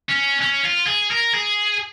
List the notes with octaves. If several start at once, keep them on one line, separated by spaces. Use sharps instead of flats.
C#4
C#4
F4
G#4
A#4
G#4